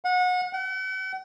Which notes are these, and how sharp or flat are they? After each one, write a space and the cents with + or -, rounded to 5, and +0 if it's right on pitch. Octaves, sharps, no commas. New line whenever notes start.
F#5 -30
F#5 +45